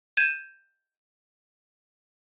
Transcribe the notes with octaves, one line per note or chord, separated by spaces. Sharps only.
G6 G#6 D#7 E7